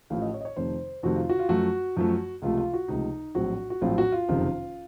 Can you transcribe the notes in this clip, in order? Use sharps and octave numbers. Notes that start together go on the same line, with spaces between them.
A1 A2 F3 A3 F5
D#5
C#5
D#5
C#5
F2 C3 D#3 A3 C4 C5
F2 C3 D#3 A3 C4 F#4
F4
F#4
F4
F#2 F3 A3 F#4
F#2 F3 A3
C#2 C3 F3 A3 F4
F4
F#4
C#2 C3 F3 A3 D#4
A#1 A2 F#3 C4 F#4
F#4
A#1 A2 F#3 C4 F4
F#4
F4
F#1 F2 C3 D#3